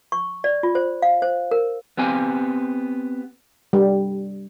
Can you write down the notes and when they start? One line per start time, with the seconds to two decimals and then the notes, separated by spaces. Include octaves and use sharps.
0.12 C#6
0.44 D5
0.63 F4
0.75 C5
1.02 F5
1.22 C5
1.51 A#4
1.97 B3 C4 G4 G#5
3.73 G3